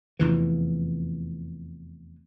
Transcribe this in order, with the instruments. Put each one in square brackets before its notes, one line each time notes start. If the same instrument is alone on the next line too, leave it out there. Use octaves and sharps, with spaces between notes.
[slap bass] F1 E2 E3